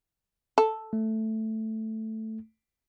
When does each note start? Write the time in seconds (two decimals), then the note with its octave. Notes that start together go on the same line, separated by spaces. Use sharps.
0.58 A4
0.93 A3